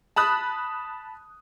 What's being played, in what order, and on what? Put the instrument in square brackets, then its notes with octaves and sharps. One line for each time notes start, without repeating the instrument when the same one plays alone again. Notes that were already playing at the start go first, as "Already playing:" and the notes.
[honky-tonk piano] A5 B5 D#6 F#6